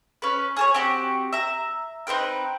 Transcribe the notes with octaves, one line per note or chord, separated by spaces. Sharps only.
C#4 B4
G#4 A4 C#5
C4 F#4 G4
E5 A#5
C4 D#4 B4 G5